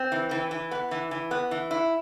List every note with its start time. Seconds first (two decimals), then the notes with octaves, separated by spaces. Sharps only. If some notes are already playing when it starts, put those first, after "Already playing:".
Already playing: C4
0.12 E3
0.31 E3
0.51 E3
0.71 B3
0.91 E3
1.11 E3
1.31 B3
1.51 E3
1.71 E4